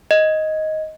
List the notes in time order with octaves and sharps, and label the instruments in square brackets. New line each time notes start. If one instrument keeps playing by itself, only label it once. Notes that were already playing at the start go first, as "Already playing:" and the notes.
[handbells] D#5